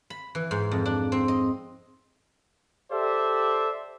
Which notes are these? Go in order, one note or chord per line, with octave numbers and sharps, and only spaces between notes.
B5
E3
G#2
F2
D4
C4
D#5
G4 A4 C5 D5 E5